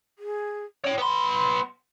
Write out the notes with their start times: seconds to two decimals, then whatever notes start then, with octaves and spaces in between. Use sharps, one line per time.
0.19 G#4
0.84 C#4 C#5 G5
0.98 B3 B5 C6